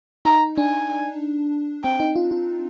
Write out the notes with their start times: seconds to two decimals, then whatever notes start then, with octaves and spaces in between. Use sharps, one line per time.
0.25 D#4 A#5
0.57 D4 G#5
1.84 C4 G5
2.00 D#4
2.16 F4
2.31 F4